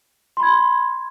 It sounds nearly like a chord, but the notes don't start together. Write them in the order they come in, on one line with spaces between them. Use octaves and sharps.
C6 B5 G#6